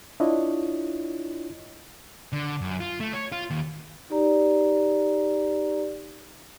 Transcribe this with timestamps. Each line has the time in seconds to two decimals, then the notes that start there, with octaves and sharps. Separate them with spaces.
0.20 D4 E4 F4 C#5 D#5
2.33 D3
2.61 F#2
2.80 F4
3.00 A3
3.13 C#5
3.32 F4
3.50 D#2
4.10 D#4 G4 D5 A#5